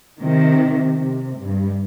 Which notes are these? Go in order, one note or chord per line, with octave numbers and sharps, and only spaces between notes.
C3 D#3
C3
G2